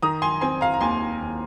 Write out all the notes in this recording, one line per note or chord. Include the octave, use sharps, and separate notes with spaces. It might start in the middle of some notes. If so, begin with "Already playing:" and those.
D#3 A#5 D#6
G#5 C6
C4 G#5 C6
F5 A#5
A#5
D#2 G#5 C6
D#2